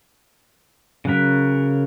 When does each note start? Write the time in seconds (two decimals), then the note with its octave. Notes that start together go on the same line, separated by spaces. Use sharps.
1.05 C#3 F#3 A#4 F#6 B6